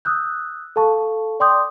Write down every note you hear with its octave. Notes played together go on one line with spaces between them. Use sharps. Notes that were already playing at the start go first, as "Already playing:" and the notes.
D#6 E6 F#6 G6
A4 F5 A5 C#6
D5 G5 C6 D6 D#6 G6